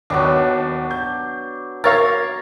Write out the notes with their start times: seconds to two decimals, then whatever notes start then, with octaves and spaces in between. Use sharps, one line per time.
0.10 D#2 F#3 B3 D4
0.91 G6
1.84 A#4 C#5 F5 A6